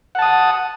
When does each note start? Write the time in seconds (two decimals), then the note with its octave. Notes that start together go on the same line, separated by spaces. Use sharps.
0.15 F#5
0.19 A5
0.22 D#6